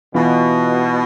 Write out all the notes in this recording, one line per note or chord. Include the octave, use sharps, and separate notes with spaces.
B2 E3 B3 F4